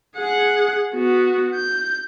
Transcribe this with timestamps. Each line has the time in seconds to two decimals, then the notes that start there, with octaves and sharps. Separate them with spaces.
0.17 G#4 F#5
0.95 B3 F#4
1.55 G6